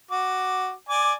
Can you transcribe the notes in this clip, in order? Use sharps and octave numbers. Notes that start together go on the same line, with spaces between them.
F#4 D6
D5 G#5 D6